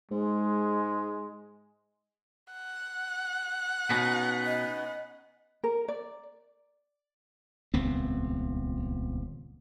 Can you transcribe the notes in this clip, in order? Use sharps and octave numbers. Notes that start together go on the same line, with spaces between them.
G#2 G#3
F#5
B2 B3 C#4 D#4
D#5
A#4
D5
D#1 C#2 B3 C4